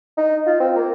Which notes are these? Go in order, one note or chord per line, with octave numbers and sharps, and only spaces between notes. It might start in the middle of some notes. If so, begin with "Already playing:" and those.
D#4
F4
C4
A#3